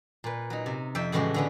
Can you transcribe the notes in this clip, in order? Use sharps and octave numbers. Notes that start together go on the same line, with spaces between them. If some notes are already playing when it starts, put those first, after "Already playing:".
A#2 B4
F#3 D#4
C3
F2 E5 G5
A2 C#3 E3 G#3 F#4 G4
D3 B3 C#4